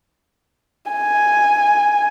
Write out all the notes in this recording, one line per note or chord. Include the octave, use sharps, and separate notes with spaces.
G#5